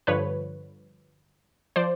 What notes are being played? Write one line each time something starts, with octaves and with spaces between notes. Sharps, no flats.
G2 D3 F3 B4 C#5
F3 C5 D5